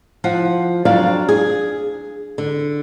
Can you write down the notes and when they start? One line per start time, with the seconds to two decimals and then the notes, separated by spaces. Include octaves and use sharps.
0.24 F3 F4 F#5
0.85 F2 F#3 D4 F4 D5 F5
1.29 G#4
2.38 D3